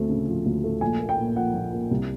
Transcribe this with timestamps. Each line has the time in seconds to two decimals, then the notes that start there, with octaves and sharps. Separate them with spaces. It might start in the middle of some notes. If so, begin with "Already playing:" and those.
Already playing: D2 A3 C4
0.09 C#3
0.27 F3
0.46 D2
0.64 A3
0.81 A#1 G#5
1.00 A#3
1.09 G5
1.18 A#2
1.36 F3 F#5
1.54 A#1
1.73 A#3
1.91 C2